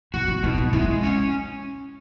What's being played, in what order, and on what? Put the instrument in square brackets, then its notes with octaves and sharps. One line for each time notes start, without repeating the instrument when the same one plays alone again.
[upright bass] E4 [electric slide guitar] F#4
[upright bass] E4
[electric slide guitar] B2 [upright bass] D#4
[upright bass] D#4
[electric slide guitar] G#3 [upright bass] E4
[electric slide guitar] C#4